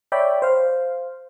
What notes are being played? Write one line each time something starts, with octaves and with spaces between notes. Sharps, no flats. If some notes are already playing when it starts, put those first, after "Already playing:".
C#5 D5 E5 G5 B5
C5 F5